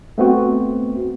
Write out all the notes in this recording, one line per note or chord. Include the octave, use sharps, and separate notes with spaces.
A3 B3 C4 F#4